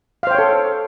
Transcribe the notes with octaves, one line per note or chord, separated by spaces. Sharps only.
A4 C5 C#5 F5 G5